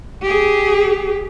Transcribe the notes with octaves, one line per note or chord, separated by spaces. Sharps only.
G4 G#4